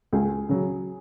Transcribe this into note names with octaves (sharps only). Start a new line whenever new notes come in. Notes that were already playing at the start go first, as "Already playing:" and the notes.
C#2 G#4
C#3 F#3